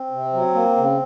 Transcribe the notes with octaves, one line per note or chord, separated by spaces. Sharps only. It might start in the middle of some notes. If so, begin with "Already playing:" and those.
Already playing: C4
C3
F#3
A#3
C#3